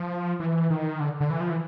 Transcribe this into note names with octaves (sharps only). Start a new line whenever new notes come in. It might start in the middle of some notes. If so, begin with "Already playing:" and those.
Already playing: F3
E3
D#3
D3
D3
E3
F3
E3